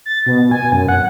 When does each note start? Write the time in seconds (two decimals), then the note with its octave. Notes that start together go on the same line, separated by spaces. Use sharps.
0.06 A6
0.26 B2
0.51 G#5
0.72 F#2
0.88 F#5